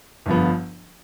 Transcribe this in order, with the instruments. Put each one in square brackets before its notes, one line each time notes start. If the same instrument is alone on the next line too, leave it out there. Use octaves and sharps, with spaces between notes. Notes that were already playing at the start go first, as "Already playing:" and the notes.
[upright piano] G1 G2 D3 F3 B3